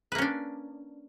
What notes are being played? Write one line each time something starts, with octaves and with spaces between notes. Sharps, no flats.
A#3 C#4 D4 B4